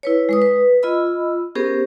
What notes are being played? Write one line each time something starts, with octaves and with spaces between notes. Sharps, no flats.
E4 B4 C#5
G#3 B4 D#6
B4
F4 D#5 B5 E6
B3 C#4 G4 G#4 A#4 C5